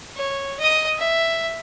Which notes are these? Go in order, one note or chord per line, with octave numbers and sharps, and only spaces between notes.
C#5
D#5 D#6
E5